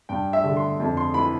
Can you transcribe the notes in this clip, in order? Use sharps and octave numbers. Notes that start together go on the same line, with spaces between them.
G2 G5
E5
D3
C6
F2
C6
E3 B5